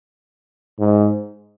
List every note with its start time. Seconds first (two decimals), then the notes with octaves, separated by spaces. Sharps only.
0.79 G#2